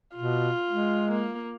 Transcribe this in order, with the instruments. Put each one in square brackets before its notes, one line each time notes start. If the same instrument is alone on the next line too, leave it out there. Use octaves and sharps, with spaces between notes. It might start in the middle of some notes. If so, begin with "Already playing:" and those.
[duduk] B2 [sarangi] F4
[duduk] G#3
[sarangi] A#3